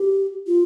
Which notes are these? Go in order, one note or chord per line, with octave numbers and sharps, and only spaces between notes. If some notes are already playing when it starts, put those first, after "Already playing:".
Already playing: G4
F4